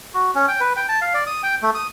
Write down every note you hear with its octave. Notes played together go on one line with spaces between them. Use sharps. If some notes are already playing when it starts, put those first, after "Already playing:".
F#4
C#4
G5
B4
G5
A5
F5
D5
D#6
G5
A3
D#6